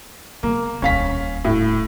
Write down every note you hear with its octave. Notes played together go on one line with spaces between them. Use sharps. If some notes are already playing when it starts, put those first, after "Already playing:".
C#3 A#3 B3
D#1 C#2 C#4 F5 B6
A2